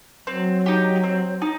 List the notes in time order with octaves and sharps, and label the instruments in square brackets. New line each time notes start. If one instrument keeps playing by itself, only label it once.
[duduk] F#3 [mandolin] C4
[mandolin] D#4 G4
C4
D#4